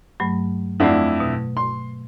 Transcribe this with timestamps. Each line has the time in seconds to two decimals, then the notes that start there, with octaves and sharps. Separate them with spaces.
0.20 G2 F#3 A3
0.80 F2 A3 D4 E4 F#5
1.20 B2
1.57 C6